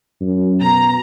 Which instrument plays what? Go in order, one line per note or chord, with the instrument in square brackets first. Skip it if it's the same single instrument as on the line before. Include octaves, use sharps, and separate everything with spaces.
[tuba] F#2
[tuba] B2 [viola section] A#5